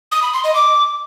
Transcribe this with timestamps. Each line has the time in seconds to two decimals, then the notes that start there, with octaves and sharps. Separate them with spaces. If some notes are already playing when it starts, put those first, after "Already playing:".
0.12 D#6
0.22 B5
0.33 C6
0.44 D#5
0.55 D6